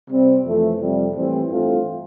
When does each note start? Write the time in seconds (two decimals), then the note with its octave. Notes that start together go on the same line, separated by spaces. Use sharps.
0.11 C3 G3 C4
0.45 F2 E3 A3
0.80 F2 C3 G3
1.15 A2 E3 G3 C4
1.50 G2 E3 A3 C4 F4